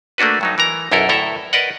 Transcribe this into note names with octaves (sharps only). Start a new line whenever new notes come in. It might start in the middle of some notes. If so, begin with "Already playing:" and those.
A3 A#3 D4 F#4 B4
G2 F#3 D#4
E3 A#4 A#5
B1 F#2 E4 A4 A#4
D2 A2 E4 A4 E5 A#5
A#4 B4 D5 D#5 F#5